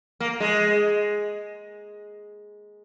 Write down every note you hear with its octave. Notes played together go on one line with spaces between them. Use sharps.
A#3
G#3